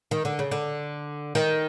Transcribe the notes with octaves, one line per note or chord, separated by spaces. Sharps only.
D#3
D3
C#3
D3
D#3